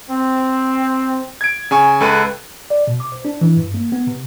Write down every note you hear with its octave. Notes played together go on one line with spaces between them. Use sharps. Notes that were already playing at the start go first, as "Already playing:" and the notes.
C4
G#6 D7
C#3 G#5 C#6
C#2 A4 B4 F#6 D#7
D5
B2
D6
C5
D4
E3
G2
A#3
B3
C3